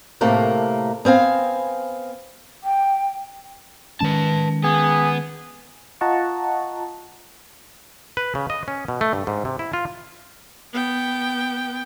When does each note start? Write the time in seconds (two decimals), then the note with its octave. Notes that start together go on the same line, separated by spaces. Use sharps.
0.21 A2 C3 A3 A#3 A#4
1.05 B3 C4 F5 G#5
2.64 G5
4.00 D#3 G#3 C#4 B4 A5
4.64 B3 G#4
6.01 F4 D#5 F#5 A5 A#5 C#6
8.17 B4
8.35 C#3
8.50 D#5
8.68 C#4
8.88 B2
9.01 A3
9.13 G2
9.27 G#2
9.45 C3
9.59 E4
9.73 F4
10.73 B3 G5